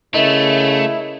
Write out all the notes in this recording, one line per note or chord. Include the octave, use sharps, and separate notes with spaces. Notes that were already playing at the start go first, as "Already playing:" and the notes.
C#3 A3 E4 A#4 D#5